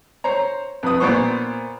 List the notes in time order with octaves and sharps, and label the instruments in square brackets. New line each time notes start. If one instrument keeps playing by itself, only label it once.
[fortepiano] C5 C#5 A#5
F2 B4 D#6
A#2 B3 C5 C#6